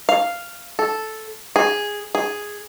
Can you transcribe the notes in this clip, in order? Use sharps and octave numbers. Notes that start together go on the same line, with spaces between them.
F5
A4
G#4
G#4